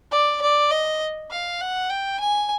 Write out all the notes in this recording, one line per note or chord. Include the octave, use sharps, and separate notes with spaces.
D5
D5
D#5
F5
F#5
G5
G#5